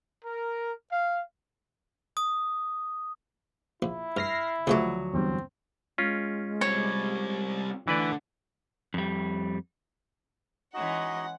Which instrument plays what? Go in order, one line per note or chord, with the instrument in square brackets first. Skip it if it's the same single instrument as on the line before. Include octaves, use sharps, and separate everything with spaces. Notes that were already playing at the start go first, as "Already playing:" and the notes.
[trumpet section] A#4
F5
[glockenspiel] D#6
[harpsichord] A#1 [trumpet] E4
[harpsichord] G2 [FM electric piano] F6 A#6 C7
[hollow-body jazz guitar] D2 F#3 [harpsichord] C#3 A3 G4 [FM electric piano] F3
[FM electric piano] E2 G2 [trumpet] C4
[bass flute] G#3 [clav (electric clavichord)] C#4 F4
[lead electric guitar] G3 C4 [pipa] C#5
[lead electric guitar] D3 [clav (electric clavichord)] E3 B4 D5 [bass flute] A3
[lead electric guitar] F2 G3
[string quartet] E3 G#3 C#4 [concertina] D#4 F#4 D#5 [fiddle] F#5